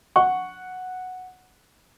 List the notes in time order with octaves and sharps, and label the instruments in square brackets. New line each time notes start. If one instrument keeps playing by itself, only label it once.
[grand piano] F#5 [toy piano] C#6